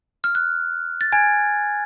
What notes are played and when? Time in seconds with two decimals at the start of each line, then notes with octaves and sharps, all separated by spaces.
0.24 F6
0.35 F#6
1.01 A6
1.12 G#5 G#6